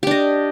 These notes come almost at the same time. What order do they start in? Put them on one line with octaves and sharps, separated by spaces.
G4 D4 D#5